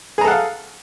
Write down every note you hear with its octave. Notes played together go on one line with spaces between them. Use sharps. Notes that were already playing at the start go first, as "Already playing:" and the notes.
G#4 A4 F5 F#5 A#5